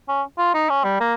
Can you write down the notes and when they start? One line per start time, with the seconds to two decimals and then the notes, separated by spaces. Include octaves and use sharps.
0.09 C#4
0.38 F4
0.54 D#4
0.70 C#4
0.84 G3
1.00 A#3